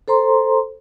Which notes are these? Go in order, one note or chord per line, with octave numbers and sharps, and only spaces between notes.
A4 C5 A#5 C6